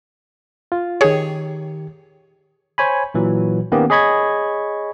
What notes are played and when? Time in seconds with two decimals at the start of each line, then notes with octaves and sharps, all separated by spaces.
0.72 F4
1.01 D#3 G4 G#4 C#5
2.78 C5 C#5 G#5 B5
3.14 A#2 E3 F#3
3.72 D#3 A#3 B3 C#4 G4
3.90 G#4 C#5 D#5 B5 C#6 G#6